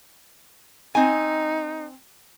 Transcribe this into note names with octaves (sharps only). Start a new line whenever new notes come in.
C4 D#4 G#5